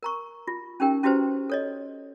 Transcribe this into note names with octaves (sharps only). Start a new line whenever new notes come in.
A#4 A#5 C#6
F4
C#4 D#4 G4 A#4 G5
C#4 E4 F#4 G4 B4 C5
A4 C#5 D#5